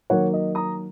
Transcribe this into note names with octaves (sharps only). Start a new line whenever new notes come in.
D#3 F#3 A#3 C#5 F#5
D#5
A#5 D#6